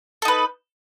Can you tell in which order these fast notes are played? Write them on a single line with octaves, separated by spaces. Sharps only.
A4 D#4 B4